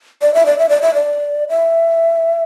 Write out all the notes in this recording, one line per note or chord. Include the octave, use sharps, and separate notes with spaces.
D5
E5
D5
E5
D5
E5
D5
E5